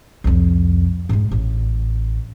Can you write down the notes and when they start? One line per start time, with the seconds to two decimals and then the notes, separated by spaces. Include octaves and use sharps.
0.24 C2 F2
1.09 G#2 G#3
1.31 A1